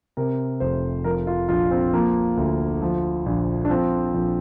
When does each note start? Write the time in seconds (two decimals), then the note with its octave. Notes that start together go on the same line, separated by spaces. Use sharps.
0.17 C3 A#4
0.60 F1 C5
1.04 F3 A#4
1.27 F4
1.49 A#1 F4
1.71 C4
1.94 F3 A#3
2.37 D2
2.82 F3
3.26 A#1
3.65 D4
3.69 F3 C4
4.14 A#1